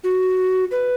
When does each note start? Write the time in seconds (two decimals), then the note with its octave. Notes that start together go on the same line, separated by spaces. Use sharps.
0.04 F#4
0.71 B4